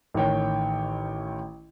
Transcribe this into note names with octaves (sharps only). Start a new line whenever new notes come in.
A1 D#3 C#5 G5